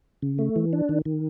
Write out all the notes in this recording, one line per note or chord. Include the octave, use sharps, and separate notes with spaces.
C#3
A3
E3
D4
D#3
D#3